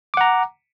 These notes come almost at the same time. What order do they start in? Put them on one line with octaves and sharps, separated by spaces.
D6 F#5 A#5